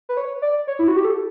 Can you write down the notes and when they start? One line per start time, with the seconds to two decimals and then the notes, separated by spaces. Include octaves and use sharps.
0.09 B4
0.17 C#5
0.42 D5
0.67 C#5
0.79 E4
0.88 F#4
0.96 G4
1.05 A4